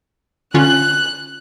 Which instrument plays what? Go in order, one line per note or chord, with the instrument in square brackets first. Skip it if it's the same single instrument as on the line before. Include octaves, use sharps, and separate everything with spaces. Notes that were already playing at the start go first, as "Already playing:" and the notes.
[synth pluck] D3 C#4 F4 [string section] F#6